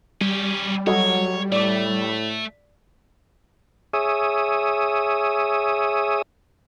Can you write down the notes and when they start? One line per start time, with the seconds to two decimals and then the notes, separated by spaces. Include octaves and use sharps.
0.21 G3 C#4 G4
0.87 F#3 F#4 A4 C#5 D#5
1.52 A2 A3 D5 D6
3.93 G#4 C#5 E5 D#6